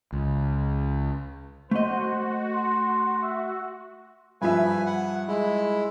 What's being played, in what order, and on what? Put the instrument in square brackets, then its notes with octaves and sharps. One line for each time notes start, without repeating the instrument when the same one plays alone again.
[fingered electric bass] C#2
[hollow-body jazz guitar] A3 D#5 [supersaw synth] F#4 [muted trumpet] C5
[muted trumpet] C6
E5
[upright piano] G2 F3 E5 [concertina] B4 G#5
[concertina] F#5
G#3 E4